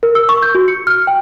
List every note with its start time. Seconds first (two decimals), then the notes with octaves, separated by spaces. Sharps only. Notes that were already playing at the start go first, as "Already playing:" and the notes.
0.03 A#4
0.15 E6
0.29 C#6
0.42 G6
0.55 F#4
0.68 C#7
0.87 F6
1.07 G5